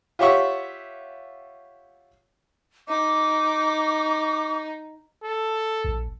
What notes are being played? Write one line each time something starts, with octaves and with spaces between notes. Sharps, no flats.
F4 G4 C#5 E5 F#5 C#6
D#4 D6
A4
A#1